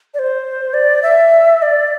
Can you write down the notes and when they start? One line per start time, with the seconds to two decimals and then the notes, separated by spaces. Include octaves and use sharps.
0.14 D5
0.19 C5
0.74 D5
1.03 E5
1.62 D5